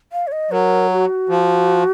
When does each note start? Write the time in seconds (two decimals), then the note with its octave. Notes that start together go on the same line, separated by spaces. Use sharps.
0.13 F5
0.27 C#5
0.32 D#5
0.51 F#3 A#4
0.91 F#4
1.29 F3